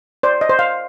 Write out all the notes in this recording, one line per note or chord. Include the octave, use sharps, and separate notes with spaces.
C5 D5
D#5
C5
F5